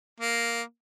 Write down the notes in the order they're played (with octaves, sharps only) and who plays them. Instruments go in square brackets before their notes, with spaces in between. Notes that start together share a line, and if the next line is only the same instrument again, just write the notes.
[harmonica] A#3